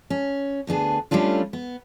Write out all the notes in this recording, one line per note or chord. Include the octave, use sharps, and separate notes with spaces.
C#4
D2 B3 D4 G#4
G3 A3 C#4 D4 F4
B3